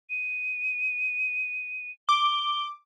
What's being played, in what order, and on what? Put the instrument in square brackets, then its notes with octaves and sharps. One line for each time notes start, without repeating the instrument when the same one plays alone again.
[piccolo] D#7
[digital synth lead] D6 [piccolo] G7